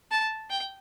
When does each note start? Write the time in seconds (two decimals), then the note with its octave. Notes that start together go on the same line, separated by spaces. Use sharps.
0.11 A5
0.50 G5